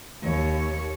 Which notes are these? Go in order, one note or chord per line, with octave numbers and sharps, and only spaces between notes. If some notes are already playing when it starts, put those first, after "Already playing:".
D#2 C#5